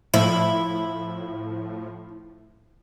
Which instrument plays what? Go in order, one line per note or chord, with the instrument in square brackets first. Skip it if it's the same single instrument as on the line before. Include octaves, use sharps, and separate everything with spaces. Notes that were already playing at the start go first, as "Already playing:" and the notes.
[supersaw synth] A2 F3 [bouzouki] E4